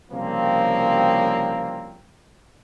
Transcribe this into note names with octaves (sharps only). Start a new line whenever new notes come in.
C2 C#3 F3 A#3 C4